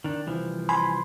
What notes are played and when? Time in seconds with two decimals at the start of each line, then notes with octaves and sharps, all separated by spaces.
0.04 D#3 D4
0.27 C2 E3 F3
0.69 G#5 B5 C6